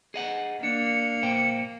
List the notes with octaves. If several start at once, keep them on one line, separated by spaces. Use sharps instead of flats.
G#4 D#5 F#5
A#3 D4 C#7
A#2 C5 G5